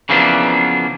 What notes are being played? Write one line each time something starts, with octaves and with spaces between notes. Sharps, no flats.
C#3 E3 F3 A#3 B3 D4